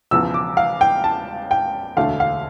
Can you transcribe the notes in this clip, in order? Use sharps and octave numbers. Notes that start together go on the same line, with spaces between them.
E1 E2 C#3 F3 E6
D6
F5
G5
A5
G5
E1 D2 D3 A3 F5
F5